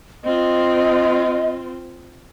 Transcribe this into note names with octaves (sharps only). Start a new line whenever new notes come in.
C4 F4 D#5